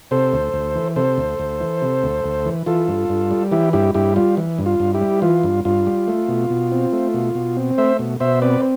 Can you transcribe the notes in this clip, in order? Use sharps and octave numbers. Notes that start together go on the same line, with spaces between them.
C3 A4 C5
D2
D2
E3
C3 A4 C5
D2
D2
E3
C3
D2
D2
E3
E3 F4 A4
G2
G2
G3
E3 E4 G4
G2 E4 G4
G2 E4 G4
G3 F4
E3
G2
F4
G2
E4 G4
G3
E3 F4
G2
G2 F4
G3
A3
B2
B2
C4
A3
B2
B2
C4
A3 C5 E5
B2
B2 C5 E5
C4 B4 D5